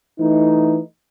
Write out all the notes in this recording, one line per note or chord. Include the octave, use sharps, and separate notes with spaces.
E3 A3 D#4